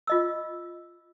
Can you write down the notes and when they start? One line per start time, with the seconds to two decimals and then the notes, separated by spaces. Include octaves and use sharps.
0.07 F4 D#5 E6